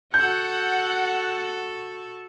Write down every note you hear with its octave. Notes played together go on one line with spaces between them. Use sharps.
F#4 A4 F#5 G6